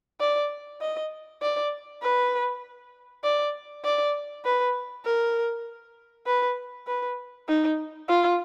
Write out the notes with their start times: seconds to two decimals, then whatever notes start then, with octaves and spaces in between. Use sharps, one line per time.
0.20 D5
0.81 D#5
1.42 D5
2.02 B4
3.24 D5
3.84 D5
4.45 B4
5.05 A#4
6.26 B4
6.87 B4
7.48 D#4
8.09 F4